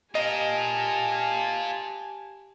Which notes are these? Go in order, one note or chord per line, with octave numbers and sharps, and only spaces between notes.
F4 G4 A#4 D#5 G#5 A5